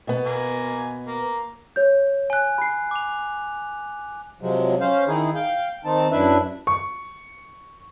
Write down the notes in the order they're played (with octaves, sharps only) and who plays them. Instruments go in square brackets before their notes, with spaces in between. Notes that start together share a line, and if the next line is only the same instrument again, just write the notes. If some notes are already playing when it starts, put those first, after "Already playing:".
[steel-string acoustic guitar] B2 B3
[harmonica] A#3 G#5
A#3
[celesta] C#5 G6
[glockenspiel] G#5 F#6
[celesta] B5 C7
[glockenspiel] D6 F7
[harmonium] C3 F3 F#3 G#3
C#4 C5 F5
D#3 D#4 E4 G#4
F5 G5
D#3 C4 D#4 A5
F#2 D4 E4 B4 E5
[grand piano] C#6